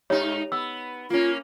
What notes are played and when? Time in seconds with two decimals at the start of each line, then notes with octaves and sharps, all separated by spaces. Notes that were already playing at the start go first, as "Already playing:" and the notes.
0.10 G#2 D#4 G4 C#5
0.52 B3 E6
1.10 A#3 C#4 F4